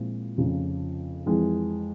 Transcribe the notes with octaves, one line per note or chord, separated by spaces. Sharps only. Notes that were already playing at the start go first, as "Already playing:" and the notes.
Already playing: A#2 F3 G#3 C4 E4
F1 F2 C#3 F3
F2 E3 G#3